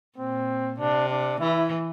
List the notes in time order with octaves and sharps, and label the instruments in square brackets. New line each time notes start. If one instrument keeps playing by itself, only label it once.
[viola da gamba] A#2 [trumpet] C4
[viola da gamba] C3 [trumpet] D4
[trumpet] D4
[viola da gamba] E3 [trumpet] E4